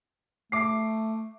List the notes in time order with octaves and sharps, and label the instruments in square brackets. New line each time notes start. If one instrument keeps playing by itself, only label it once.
[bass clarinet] A3 [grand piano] D6 C7